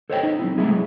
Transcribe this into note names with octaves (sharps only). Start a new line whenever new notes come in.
A4 C5 C#5 D#5 E5 G5
D#4
F#3 C4 E4
G#3 A3 D#4 E4 G#4
F#3